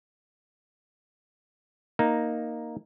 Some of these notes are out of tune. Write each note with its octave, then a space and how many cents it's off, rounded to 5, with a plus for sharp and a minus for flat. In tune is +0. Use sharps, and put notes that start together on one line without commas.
A#3 +0 D#4 -5